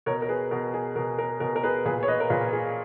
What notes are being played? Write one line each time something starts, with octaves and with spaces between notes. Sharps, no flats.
B2 A#4 C#5
A#4
G#4 B4
B2 A#4
G#4
B2 A#4
A#4
B2 A#4
A#4
G#4 B4
A#2 G#4 B4
C#5
B4 D#5
A#4
A#2 G#4 B4
G#4